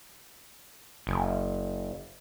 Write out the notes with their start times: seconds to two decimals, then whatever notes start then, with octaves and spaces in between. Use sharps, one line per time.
1.07 F#1